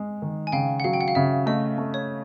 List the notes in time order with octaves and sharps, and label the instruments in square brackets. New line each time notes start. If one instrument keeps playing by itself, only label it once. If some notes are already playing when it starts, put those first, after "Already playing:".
Already playing: [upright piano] G#3
D#3
[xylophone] G#5
[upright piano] C#3 [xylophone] F5 G5
[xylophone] F#5
[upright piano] F#3 [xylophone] F5
[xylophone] G5
F#5
F5
[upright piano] C#3 [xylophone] E5
[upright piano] A3 [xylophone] D#5
[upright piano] A3
[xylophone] C#5